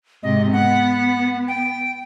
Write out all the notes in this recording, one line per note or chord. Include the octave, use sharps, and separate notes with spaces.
G#2 C3 D#5
B3 F#5
G5